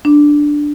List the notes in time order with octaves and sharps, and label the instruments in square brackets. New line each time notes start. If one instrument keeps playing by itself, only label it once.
[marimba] D4